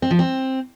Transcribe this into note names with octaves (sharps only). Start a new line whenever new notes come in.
C4
F3
C4